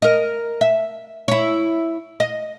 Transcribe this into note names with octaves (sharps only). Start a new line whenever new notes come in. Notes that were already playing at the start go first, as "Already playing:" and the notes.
A#4 D#5
E5
E4 C#5
D#5